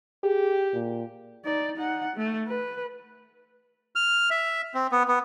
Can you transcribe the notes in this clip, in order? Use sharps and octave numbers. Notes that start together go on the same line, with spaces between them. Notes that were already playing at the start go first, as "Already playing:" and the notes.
G4 G#4
A#2
D#4 D5
D#4 F#5
A3
B4
F6
E5
C4
B3
B3